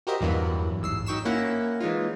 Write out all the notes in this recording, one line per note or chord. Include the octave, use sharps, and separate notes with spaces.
F#4 G4 A#4 C5 D#5 E5
E2 G2 E3 F#3 A#3 B3
A1 G#2 E6 C7
F#3 D#4 G5 C#6 B6 E7
A#3 C#4 E4 F#5 A#5
E3 G#3 D#4 F4